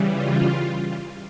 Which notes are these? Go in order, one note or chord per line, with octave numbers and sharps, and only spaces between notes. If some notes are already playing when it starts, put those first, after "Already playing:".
Already playing: C#3 E3 G3
F4